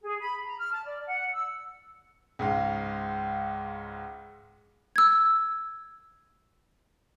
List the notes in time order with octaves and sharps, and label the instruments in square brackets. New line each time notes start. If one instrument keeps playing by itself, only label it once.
[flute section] G#4
B5
A#5
F6
A5
D5
F#5
E6
[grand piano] C#2 G#2 F5
[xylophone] E6 G#6